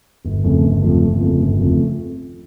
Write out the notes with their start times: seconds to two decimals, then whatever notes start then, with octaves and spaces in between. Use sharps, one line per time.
0.25 G1
0.44 F2 C#3 F3 A3
0.63 G1
0.82 F2 C#3 F3 A3
1.01 G1
1.21 F2 C#3 F3 A3
1.40 G1
1.59 F2 C#3 F3 A3